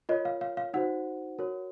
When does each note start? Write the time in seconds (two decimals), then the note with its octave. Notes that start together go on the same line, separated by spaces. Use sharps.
0.09 F4 A#4 C#5 D#5
0.25 F5
0.41 F5
0.57 F5
0.74 D#4 F#4 C5 F#5
1.39 F#4 A#4 C#5